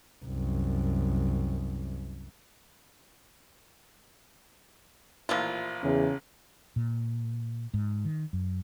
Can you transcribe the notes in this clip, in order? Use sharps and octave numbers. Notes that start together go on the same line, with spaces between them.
C2 F#2
A1 A#2 F3 E4 F4
E2 C#3
A#2
G#2
D#3
F#2